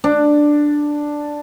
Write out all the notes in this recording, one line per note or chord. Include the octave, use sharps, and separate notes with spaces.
D4